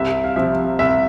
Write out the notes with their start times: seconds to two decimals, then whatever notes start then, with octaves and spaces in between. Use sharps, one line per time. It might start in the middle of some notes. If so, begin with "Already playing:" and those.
Already playing: C2 E5
0.24 F5
0.36 C3 F3 E5
0.79 C2 E5